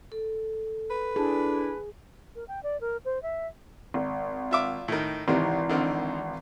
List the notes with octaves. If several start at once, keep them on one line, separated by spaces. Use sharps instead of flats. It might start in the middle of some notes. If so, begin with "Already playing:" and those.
A4
B4
D4 E4 G#4
A#4
G5
D5
A#4
C5
E5
G#1
F4 E5 D6
A2 D#3
G#1 C3 D#3 E3
D3 D#3 C4